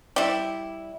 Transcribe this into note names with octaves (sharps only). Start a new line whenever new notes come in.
G3 E4